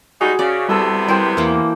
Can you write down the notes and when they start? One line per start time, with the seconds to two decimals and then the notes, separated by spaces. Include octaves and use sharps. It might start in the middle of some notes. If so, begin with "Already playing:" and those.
0.21 G3 G#3 D#4 F#4 G#4
0.39 C#3 D5
0.69 C3 G3 B3 E4 A4 E6
1.08 E4 A#4 C5 G5 C6
1.37 E2 E3 A#3